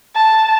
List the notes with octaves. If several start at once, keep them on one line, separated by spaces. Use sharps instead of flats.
A5